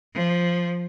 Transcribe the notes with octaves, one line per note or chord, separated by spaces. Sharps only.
F3